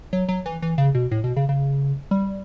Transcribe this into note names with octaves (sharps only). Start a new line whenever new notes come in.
F#3
F#3
E3
E3
C#3
B2
A2
B2
C#3
C#3
G3